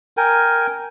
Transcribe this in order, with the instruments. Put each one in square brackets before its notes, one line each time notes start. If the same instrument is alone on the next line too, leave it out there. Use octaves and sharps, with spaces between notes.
[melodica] A#4 G5 G#5